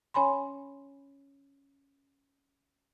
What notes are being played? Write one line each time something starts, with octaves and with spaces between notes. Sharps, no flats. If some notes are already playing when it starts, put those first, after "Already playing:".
C#4 C#5 G#5 B5 C6